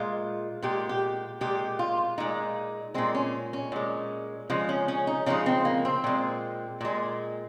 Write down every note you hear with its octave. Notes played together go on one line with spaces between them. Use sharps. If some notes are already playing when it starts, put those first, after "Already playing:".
Already playing: A#2 G#3 F4
A#2 G#3 G4
G4
A#2 G#3 G4
F4
A#2 G#3 D#4
A#2 G#3 C4
C#4
C#4
A#2 G#3
C#3 F3 G#3
C#4
C#4
D#4
C#3 F3 G#3 D#4
C4
A#3
C4
A#2 G#3
A#2 G#3